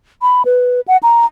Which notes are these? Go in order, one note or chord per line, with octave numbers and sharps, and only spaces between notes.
B5
B4
F#5
A#5